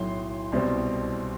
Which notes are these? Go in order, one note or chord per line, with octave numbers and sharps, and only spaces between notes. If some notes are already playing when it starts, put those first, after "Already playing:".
Already playing: B1 A2 F#3 C6
C2 B2 G3 C4